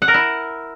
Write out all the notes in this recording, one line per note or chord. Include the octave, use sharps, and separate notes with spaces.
F#5
A#4
E4